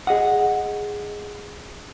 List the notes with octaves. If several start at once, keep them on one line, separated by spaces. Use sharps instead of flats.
G#4 D#5 F#5